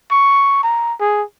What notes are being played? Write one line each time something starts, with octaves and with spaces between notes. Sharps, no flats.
C#6
A#5
G#4